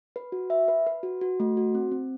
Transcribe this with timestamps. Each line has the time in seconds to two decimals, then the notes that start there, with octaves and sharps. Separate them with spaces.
0.16 B4
0.32 F#4
0.50 E5
0.68 B4
0.87 B4
1.03 F#4
1.21 F#4
1.40 A3
1.57 F#4
1.75 C4
1.92 C4